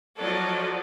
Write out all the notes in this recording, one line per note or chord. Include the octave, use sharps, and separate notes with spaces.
F3 F#3 A4 D5 D#5